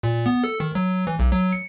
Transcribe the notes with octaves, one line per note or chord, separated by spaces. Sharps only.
A#2
B3
A4
D#3
F#3
E3
B1
F#3
C#7